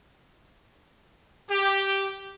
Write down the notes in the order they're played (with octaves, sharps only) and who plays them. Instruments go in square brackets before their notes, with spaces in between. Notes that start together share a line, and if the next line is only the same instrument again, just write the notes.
[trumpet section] G4